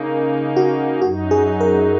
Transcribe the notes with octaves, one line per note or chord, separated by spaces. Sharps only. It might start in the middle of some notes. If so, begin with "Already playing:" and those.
Already playing: C#3 A#3 D#4 A#4
F#4
F#2 F#3 D#4 F#4
G#4
A#4